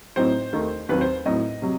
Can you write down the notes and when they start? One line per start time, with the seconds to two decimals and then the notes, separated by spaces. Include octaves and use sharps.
0.16 A2 F#3 C4 D#4 C5
0.53 D#2 D#3 A3 D#4
0.89 D#2 D#3 F#3 C4 B4
1.01 C5
1.25 A2 F#3 C4 D#4 D#5
1.62 C3 F#3